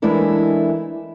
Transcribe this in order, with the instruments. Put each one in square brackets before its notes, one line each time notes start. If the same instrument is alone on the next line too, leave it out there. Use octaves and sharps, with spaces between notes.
[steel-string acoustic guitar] E3 G#3 A3 D4 E4 A#4